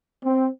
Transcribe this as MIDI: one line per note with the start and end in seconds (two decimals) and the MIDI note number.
0.24 0.47 60